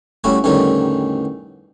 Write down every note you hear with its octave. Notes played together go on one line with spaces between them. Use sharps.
G3 A3 C#4 E4 F#4
A1 E2 D3 D#3 G3 C#5